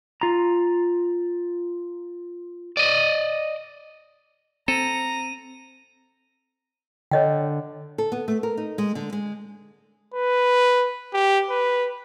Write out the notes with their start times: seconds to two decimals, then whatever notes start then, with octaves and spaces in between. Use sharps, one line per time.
0.21 F4 A#5
2.77 D5 D#5
4.68 C4 A4 A#5 D#7
7.11 D3 C#5 D#5 G5
7.98 A4
8.12 B3
8.28 A3
8.43 A#4
8.57 D#4
8.78 G#3
8.95 D3
9.13 G#3
10.14 B4
11.14 G4
11.50 B4